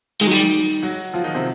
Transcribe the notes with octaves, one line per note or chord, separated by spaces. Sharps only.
D#3 G#3 D#4
F#3
G3
F#3 F#4
F3 F4
D#3 D#4
C3 C4